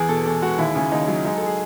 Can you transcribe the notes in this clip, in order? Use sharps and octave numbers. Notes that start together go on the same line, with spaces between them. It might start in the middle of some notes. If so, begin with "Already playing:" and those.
Already playing: E2 G#4
B2 A4
E2 A4
G#3 F#4
D#2 E4
C#3 C#4
D#2 D#4
F#3
G#3 D#4
G#3 A4
G#4